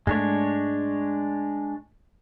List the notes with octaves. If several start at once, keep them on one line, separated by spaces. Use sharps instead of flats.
G#2 G#3 A3 D4 C#5